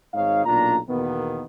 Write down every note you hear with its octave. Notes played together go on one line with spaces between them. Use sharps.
G#1 G#2 D#4 C#5 F5
B1 A#2 D4 F4 A#5
E2 B2 D#3 A#3 B3